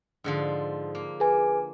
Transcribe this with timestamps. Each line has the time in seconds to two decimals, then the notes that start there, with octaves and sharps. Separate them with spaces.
0.24 G#2 D3 F3
0.95 A#3
1.20 G#4 B4 G#5